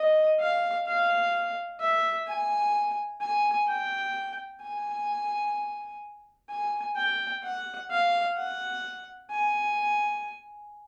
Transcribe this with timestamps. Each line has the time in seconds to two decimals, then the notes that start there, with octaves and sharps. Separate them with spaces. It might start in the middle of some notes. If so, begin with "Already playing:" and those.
Already playing: D#5
0.40 F5
0.87 F5
1.81 E5
2.28 G#5
3.21 G#5
3.68 G5
4.62 G#5
6.50 G#5
6.96 G5
7.43 F#5
7.90 F5
8.37 F#5
9.31 G#5